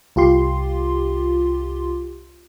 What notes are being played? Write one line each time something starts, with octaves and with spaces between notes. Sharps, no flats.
C2 F4 G4 C6